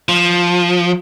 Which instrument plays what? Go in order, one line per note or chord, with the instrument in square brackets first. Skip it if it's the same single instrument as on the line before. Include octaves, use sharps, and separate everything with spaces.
[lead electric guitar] F3